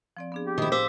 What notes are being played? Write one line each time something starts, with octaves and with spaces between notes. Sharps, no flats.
F3 C4 D5
B3 D4 G#4
G4
A2 D#3 E4 C5 D#6
C5 F5 D6 E6 B6